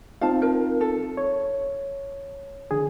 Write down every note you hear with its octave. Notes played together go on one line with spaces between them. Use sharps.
C4 D#4 F4 F5 A5
A#4
A4
C#5
D3 G#4